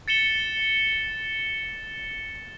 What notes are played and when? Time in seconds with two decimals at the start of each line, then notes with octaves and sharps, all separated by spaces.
0.08 A6 C#7 E7 G7